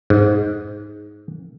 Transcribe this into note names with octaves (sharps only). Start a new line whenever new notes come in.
G#2